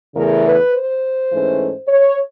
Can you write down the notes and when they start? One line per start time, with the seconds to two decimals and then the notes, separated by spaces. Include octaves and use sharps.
0.15 E2 C#3 E3 A3 A#4
0.44 B4
0.72 C5
1.31 G#2 E3 A3 C#4
1.88 C#5